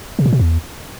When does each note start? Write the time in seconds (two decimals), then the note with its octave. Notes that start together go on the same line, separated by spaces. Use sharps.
0.19 C3
0.26 A#2
0.33 B2
0.40 E2